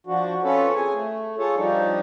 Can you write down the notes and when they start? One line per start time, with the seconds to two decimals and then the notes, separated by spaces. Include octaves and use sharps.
0.07 F3 D4 F#4
0.44 C4 C#4 F4 A4 B4 C#5
0.75 G#4 G#5
0.93 A3
1.38 F4 G#4 A4 C#5
1.56 F3 G3 D4 D#4